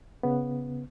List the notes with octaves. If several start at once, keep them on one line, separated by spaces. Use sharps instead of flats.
C#3 B3